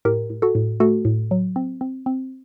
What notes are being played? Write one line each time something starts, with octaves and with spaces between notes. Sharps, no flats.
A2 G4 A#4
A2
F#4 A4
A2
A3 F#4 A4
A2
F#3
C4
C4
C4